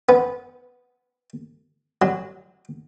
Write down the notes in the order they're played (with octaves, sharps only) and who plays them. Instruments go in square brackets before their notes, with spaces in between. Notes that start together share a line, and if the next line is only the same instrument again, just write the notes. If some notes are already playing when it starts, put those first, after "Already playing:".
[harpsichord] B3
F#3